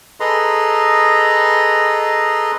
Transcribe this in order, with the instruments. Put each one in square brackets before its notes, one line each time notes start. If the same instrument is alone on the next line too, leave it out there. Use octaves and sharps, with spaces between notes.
[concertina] G#4 A4 B4 D#5 A#5 C6